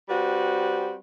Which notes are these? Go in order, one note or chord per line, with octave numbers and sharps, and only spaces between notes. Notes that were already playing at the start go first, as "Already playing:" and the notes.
G3 C4 F#4 B4